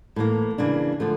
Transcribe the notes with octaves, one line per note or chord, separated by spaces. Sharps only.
A2 E3 A#3
C#3 E3 A#3 D4
D3 F3 A3